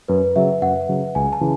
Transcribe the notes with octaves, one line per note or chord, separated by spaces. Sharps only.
F#2 B4
C#3 F#3 E5
F#2 F#5
C#3 F#3
C#2 G#5
A5
C#3 E3